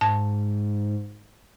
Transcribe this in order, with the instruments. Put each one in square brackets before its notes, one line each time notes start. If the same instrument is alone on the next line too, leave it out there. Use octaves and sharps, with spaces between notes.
[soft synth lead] G#2 [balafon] A5